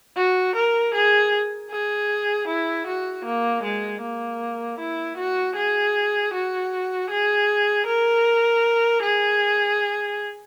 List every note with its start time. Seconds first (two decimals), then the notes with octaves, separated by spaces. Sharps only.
0.17 F#4
0.56 A#4
0.94 G#4
1.71 G#4
2.48 E4
2.87 F#4
3.25 A#3
3.63 G#3
4.02 A#3
4.79 E4
5.18 F#4
5.56 G#4
6.34 F#4
7.10 G#4
7.87 A#4
9.02 G#4